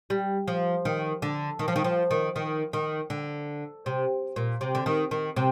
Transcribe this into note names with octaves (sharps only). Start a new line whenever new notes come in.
G3
F3
D#3
D3
D#3
F3
D#3
F3
D#3
D#3
D#3
D3
C3
A#2
C3
D3
D#3
D#3
C3